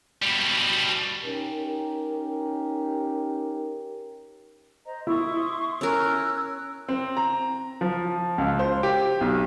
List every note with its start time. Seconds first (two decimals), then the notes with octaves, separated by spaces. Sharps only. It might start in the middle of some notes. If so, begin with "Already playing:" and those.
0.22 B2 G3
1.25 C#4 D#4 G4 A#4
4.85 C5 D#5 A#5
5.07 E4 C6 C#6 D#6
5.81 C#4 A#4 C#5 E6 F#6
6.88 C4
7.17 A#5
7.81 F3
8.38 C#2
8.59 C5
8.83 G4
9.21 B1